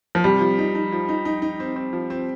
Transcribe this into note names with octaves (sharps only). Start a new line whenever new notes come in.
F3
C3 G3
F3
D#4
D#4
F3
D#4
D#4
D#4
C4
C4
F3
C4